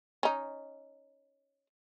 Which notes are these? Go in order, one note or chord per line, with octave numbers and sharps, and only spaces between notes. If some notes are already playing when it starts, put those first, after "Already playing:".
C#4 D#4